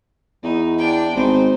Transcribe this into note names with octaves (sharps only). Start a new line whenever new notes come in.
E2 D#4
D4 G5
G#1 D#4 C5